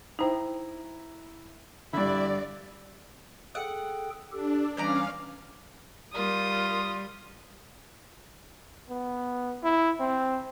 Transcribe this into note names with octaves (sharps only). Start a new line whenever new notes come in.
D#4 E4 C5 G5 A#5
G2 D3 E4 D5 E5 B5
G#4 A4 F#5 G5
D4 G4 A4
E3 G3 B3 C#4 D5 F5 A#5
G3 F4 A#4 D#6
B3
E4
C4